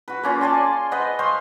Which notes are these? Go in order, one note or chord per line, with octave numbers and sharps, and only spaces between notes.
F#4 B4
A#3 C#4 F4
D5 G#5 A5 C6
B4 C5 D#5 F#5
C5 F5 C6 C#6